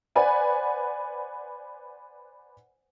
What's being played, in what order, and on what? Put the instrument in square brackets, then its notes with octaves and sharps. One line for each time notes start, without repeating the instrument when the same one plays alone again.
[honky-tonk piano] B4 C5 D5 F#5 G#5 B5